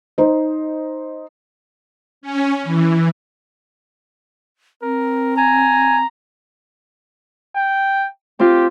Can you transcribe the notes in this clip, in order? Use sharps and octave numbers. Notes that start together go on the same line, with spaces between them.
D#4 C5 D#5
C#4
E3
C4 A#4
G#5 A#5
G5
C4 F4 G4